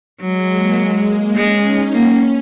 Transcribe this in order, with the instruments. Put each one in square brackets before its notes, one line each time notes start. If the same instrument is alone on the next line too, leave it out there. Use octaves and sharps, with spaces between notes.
[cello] F#3 [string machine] G#3
[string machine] A#3
G#3
A#3
[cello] G#3 [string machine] C#4
[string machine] D#4
[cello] A#3 [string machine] C#4